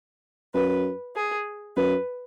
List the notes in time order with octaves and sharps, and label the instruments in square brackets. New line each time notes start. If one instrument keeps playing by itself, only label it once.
[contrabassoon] F#2 [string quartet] B4
[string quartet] G#4
[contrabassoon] F#2 [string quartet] B4